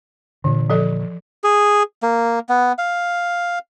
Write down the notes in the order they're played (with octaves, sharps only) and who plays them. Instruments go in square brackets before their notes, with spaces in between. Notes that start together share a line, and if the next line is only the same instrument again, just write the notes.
[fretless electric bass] A#2 D3 [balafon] E3
[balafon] F3 A4 D#5
[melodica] G#4
A#3
B3
F5